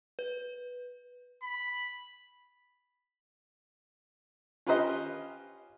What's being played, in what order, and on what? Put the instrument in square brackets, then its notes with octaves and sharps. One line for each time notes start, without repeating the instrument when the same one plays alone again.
[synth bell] B4
[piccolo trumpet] B5
[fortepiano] C#4 F4 G4 B4 C5 D#5